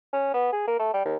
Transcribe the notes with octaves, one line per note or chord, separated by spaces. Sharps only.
C#4
B3
G#4
A#3
A3
G3
D#2